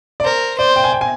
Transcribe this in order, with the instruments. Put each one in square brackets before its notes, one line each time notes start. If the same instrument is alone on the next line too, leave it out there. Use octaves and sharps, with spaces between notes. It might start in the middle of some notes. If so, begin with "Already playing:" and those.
[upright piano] D5
[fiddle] A#4 [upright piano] C5
[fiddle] C5 [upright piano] D5
[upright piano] G5
G#5
G5
G#5